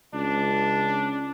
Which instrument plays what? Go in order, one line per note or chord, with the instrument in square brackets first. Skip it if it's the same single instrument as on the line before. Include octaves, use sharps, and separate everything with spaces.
[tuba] C#2 [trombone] D4